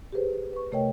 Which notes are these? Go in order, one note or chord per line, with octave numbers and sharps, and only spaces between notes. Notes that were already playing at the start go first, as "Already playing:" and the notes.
G4 G#4 B4 C5
B4 C#6
C3 A3 A#4 C#5 D#5 G5